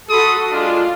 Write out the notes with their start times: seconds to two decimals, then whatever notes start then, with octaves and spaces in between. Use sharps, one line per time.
0.10 F#4 A4 B5 C6 D#6
0.52 G#3 D4 F4